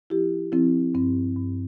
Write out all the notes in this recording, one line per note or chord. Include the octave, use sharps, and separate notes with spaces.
F3 E4 G4
F3 C4 E4
G2 C4
G2